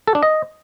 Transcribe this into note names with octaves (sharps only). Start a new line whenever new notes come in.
A4
D4
D#5